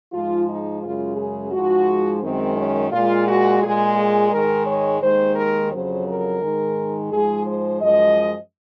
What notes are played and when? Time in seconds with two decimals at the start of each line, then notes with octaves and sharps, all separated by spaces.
0.12 G#2 F3 G#3 F4
0.47 D#4
0.82 F#2 C#3 G#3 F4
1.16 G#4
1.52 G#2 F3 G#3 F#4
2.22 F#2 D#3 G#3 C4
2.56 C#4
2.91 A#2 G#3 F4
3.27 F#4
3.61 A#2 G#3 G#4
3.96 G#4
4.31 G#2 D#3 G#3 A#4
4.66 C#5
5.02 D#2 D#3 G#3 C5
5.36 A#4
5.71 F2 C#3 F#3 C5
6.06 A#4
6.41 G#2 D#3 G#3
7.10 G#2 F3 G#3 G#4
7.46 C5
7.80 F#2 F3 G#3 D#5